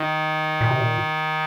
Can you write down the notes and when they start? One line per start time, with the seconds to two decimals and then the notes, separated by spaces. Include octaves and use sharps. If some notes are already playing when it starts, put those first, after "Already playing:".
Already playing: D#3
0.61 A#2
0.70 C3
0.81 A#2